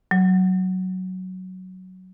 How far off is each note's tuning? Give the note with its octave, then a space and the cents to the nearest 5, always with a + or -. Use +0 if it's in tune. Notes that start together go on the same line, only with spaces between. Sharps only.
F#3 +5